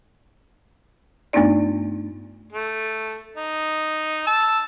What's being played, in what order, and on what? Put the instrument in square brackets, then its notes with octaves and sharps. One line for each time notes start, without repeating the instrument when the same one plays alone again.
[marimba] G2 A3 B3 D4 D#4 D5
[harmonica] A3
D#4
A5 E6